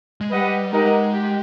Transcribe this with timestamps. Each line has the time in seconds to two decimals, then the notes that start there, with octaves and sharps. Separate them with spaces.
0.21 G#3
0.31 G3 G4 B4 D#5 F#5
0.72 G#3 D#4 G4 A#4 D#5 F#5
1.13 G4